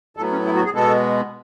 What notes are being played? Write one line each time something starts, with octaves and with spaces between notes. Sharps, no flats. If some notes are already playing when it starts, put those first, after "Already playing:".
A2 F#3 B3 A4
C#4
E4
F#4
G#4
B2 G#3 B3 A4